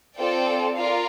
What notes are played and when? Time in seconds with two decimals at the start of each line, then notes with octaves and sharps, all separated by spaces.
0.17 C4 F4 A4 D5 G5
0.74 F4 A#4 D5 F5